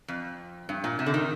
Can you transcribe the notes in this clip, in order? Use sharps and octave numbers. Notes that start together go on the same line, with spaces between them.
F2
G2
A#2
C3
D3
D#3